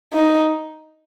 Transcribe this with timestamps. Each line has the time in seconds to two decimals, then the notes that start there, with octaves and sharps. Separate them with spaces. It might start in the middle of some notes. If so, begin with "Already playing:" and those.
0.13 D#4